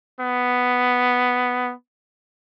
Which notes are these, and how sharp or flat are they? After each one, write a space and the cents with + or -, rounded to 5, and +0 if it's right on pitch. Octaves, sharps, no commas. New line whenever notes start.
B3 +5